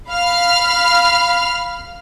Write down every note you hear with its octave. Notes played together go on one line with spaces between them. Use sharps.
F5 B5 F6